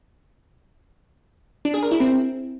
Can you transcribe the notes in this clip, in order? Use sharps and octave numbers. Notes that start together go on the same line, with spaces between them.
D4
G#4
A#4
E4
C4